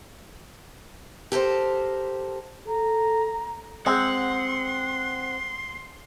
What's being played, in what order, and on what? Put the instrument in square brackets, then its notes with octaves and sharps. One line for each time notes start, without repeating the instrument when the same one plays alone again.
[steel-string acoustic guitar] G4 A4 A#4 C5
[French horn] A4 [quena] A#5
[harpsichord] G#3 [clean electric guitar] C4 [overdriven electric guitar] F#5 [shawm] C6